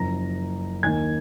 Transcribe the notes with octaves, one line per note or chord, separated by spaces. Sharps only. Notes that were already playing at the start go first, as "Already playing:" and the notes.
Already playing: F#1 F#2 F3 A#5 A#6
D#2 D#3 A#3 G#5 G#6